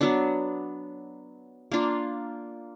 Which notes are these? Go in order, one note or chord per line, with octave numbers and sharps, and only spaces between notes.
F#3 B3 D4
A#3 D4 F4